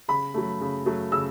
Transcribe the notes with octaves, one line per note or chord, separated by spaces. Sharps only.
C#3 B5
F#3 A3
C#3
F#3 A3
C#3 E6